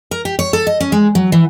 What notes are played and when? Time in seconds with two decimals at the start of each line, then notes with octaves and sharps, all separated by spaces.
0.11 A#4
0.25 G4
0.39 C#5
0.53 A4
0.67 D#5
0.81 C#4
0.92 G#3
1.15 F#3
1.32 E3